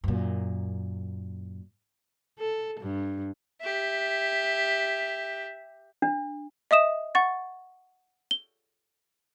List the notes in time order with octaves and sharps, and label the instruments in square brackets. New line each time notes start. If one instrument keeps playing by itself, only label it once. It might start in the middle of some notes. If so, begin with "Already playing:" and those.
[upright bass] F#2 A#2
[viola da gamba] A4
G2
[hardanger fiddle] G4 E5
[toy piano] D4
[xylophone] D#5 E5 D#6 E7
F#5 C#6 A6
G7